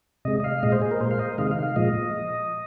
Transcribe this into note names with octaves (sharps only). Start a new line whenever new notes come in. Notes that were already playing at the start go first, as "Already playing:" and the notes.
C3 G#3 D#5
D#5
F5
A#2 G#3 D#5
C5
G#4
A#4
A#2 G#3 C5
F5
D#5
C3 D#3 G#3 F5
F5
F5
A#2 F3 G#3 D#5